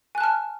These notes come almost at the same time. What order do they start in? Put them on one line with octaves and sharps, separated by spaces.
G#5 F#6 A5 F6